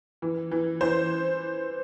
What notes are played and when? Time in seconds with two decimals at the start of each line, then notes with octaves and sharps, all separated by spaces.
0.22 E3
0.51 E3
0.81 E3 C5